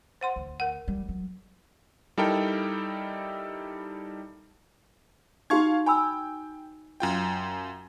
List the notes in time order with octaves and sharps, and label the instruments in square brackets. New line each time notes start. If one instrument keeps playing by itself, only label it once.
[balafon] C5 F#5 C6
[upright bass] D2
[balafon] A#4 F#5
[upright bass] G3
F#3
[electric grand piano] G3 D#4 E4 A4 A#4 G5
[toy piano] D#4 F#4 [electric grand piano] F5 C#6 G#6
[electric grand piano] G5 [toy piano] G#5 B5 E6
[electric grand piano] F#2 F4 G5